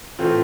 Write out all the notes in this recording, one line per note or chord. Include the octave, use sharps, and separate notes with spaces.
A2 E3 A3 C4 F4